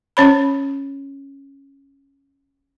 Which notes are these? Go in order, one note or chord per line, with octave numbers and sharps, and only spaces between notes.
C#4 C#5 B5